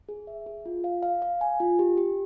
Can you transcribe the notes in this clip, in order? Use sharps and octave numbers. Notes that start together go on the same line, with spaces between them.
G#4
E5
G#4
F4
F5
F5
F5
G#5
F4
G4
G4